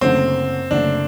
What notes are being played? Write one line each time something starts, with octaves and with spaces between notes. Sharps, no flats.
F#1 F#2 D3 A3 C4
F#1 F#2 D3 A3 D4